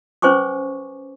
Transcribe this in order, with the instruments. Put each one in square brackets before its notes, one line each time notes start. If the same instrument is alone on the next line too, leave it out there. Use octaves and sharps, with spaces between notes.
[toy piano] C#4 B4 C5 G#5 C#6 D6